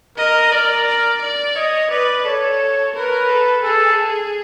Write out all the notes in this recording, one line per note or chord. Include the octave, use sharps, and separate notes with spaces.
A#4 D#5
A#4 D5
D5
D5
C#5 D#5
B4 D5
A4 C#5
A#4 B4
A4
G#4 A4